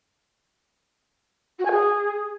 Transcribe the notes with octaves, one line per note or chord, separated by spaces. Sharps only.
F#4
G#5
G#4